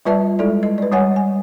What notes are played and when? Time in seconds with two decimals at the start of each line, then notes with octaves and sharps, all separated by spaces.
0.05 G3 F4 B4 D5 E5 A5
0.39 G#3 E4 A4 D5
0.63 D#5
0.78 B4 D5
0.92 G3 C#5 F#5 G#5
1.16 G#5